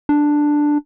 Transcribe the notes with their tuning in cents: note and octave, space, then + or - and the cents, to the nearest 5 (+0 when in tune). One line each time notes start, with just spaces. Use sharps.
D4 +5